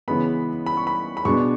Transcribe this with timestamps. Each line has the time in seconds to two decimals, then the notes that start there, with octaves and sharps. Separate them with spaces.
0.08 C#3 E3 G#3 B3 B5
0.66 B5
0.77 C#6
0.87 B5
1.17 B5
1.25 B2 G#3 B3 D4 C#6